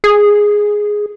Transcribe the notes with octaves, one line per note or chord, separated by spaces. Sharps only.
G#4